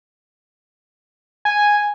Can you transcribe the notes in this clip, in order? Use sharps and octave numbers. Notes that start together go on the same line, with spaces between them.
G#5